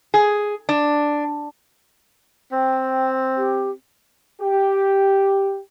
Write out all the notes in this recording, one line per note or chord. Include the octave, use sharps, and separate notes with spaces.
G#4
D4
C4 G5
G4
G4